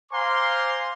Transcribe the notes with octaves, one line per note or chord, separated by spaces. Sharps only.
C5 F5 G#5 A#5 C6 D6